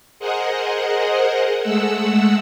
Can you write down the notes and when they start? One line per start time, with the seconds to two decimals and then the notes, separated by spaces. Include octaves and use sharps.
0.19 G#4 A#4 C5 D#5 F#5
1.62 G#3 A3 F#5 E6